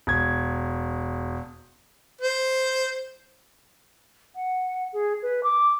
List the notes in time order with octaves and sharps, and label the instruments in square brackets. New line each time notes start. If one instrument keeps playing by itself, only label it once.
[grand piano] E1 G#6
[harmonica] C5
[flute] F#5
G#4
B4
D6